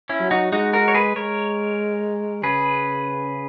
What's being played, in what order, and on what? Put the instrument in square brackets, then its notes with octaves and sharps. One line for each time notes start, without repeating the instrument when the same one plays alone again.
[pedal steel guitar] C#4 E4
[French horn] F#3
[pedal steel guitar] D#4 F#4
[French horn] G#3 [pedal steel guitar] D#4 F#4
[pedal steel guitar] F#4 A#4
C#5
G#4 B4
[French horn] G#3 [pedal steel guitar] A#4 C#5
[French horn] C#3 [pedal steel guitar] G#4 B4